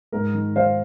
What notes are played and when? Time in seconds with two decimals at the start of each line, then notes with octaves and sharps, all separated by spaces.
0.12 G#2 A#4
0.34 D#3
0.56 D#3 C5 F5